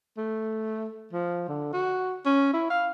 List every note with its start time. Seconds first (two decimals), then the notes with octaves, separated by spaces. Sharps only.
0.17 A3
1.13 F3
1.48 D3
1.73 F#4
2.26 C#4
2.53 E4
2.70 F5